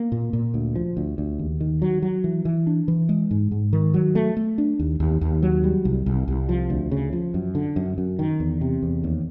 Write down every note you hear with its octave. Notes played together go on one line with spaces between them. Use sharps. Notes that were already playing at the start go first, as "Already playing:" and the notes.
Already playing: A#3
A#2
A#2
D2
F3
D2
D2
D#2
D#3
F#3
F#3
E3
E3
D4
E3
G#3
G#2
G#2
D#3
F#3
A3
A3
D4
D#2
D#2
D#2
F#3
G3
C2
C2
C2
F3
D2
C#3
F3
F#2
D3
F#2
F#2
D#3
E2
C3
E2
D#2